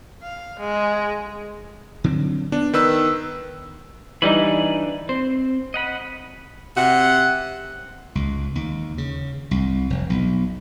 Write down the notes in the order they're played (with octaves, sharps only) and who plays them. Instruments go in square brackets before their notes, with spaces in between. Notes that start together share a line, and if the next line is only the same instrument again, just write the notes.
[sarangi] F5
G#3
[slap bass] D3 F#3 C4
[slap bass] B3 [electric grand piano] D4
[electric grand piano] D#3 B4 E6
[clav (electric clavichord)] E3 G3 D#4 [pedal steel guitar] D4 G#5 B5
[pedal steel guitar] C4 [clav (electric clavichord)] C5
[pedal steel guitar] D#5 F#5 B5
[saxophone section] C3 F#5
[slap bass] C#2
D#2
C#3
C2
F1
B1